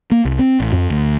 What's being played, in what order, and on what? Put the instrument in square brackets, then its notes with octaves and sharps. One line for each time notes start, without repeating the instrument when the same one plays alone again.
[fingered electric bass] A#3
C2
C4
A1
F2
D2